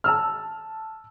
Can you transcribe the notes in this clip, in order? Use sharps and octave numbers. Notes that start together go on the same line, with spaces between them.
A5 E6 F6